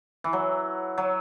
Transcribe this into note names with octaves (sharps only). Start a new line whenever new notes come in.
E3
F#3
F#3